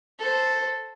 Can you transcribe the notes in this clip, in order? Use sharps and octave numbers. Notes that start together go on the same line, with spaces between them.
A4 C5